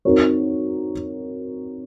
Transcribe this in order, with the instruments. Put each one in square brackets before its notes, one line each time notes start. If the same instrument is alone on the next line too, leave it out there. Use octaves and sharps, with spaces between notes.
[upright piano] C4 D#4 F#4 A#4 C#5